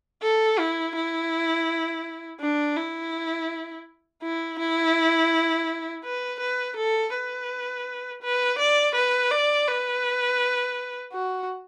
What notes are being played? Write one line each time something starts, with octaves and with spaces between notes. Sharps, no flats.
A4
E4
E4
D4
E4
E4
E4
B4
B4
A4
B4
B4
D5
B4
D5
B4
F#4